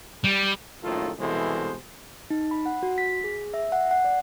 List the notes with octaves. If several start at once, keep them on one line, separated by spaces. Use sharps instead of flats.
G3
A#1 F#2 A2 D#3 F4 A4
C2 B2 E3 G#3 A4 C5
D#4
B5
F#5
F#4
B6
G#4
E5
F#5
F#5
D5